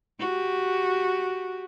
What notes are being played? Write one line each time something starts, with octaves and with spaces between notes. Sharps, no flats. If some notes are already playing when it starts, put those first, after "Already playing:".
F#4 G4